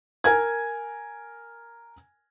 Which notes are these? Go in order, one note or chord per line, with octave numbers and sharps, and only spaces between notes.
A#4 G#5 G#6